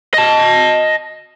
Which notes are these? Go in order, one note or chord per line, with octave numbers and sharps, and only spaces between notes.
D#5 A5